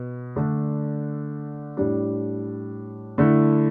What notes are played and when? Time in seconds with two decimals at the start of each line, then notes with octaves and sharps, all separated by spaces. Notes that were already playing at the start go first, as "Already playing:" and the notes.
Already playing: B2
0.36 D3 A3 D4
1.77 A2 G3 D4
3.18 D3 A3 E4